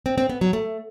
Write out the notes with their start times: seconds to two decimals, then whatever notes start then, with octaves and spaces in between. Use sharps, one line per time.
0.06 C4
0.18 C4
0.29 B3
0.41 F#3
0.53 A3